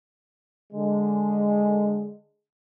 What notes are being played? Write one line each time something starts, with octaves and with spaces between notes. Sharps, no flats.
D3 G#3